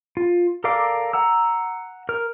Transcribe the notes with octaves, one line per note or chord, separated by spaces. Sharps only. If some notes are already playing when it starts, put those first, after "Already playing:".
F4
A4 A#4 D5 F5 D6
F#5 A#5 E6
A#4 F6